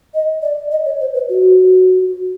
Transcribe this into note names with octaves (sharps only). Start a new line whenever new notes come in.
D#5
D5
D#5
C#5
C5
B4
F#4